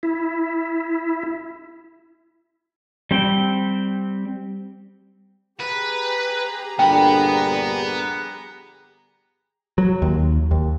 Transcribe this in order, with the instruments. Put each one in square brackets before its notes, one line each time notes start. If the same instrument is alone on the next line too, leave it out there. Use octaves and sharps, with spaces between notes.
[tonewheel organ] E4
[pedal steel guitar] G3 C4 G5
[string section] G4 G#4 A#5 [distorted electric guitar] B4
[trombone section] A#1 G2 D3 [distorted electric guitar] B3 B5 [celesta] G5
[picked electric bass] F#3
D#2
D#2